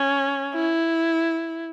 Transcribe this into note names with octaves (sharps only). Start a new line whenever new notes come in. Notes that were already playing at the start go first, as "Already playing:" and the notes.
Already playing: C#4
E4